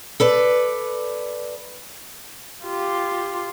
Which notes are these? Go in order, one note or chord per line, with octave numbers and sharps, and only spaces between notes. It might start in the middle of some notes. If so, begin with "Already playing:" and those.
A4 B4 D5
F4 G4